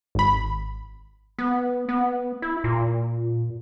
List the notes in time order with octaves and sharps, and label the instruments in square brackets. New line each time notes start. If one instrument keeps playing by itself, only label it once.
[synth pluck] G#1 B5
[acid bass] B3
B3
E4
A#2